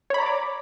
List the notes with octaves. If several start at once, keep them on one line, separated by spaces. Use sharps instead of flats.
C#5 D5 A#5 B5 D6